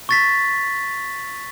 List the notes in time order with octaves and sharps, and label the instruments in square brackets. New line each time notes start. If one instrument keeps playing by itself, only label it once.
[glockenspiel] C#6 A6 B6